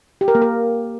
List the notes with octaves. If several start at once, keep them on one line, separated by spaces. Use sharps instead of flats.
G4
A#4
A#3
A#4